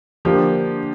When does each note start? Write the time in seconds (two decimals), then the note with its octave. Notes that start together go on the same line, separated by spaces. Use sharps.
0.25 D3 F3 A#3 D4 G4